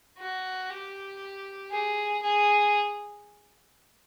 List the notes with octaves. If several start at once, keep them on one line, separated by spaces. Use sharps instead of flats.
F#4
G4
G#4
G#4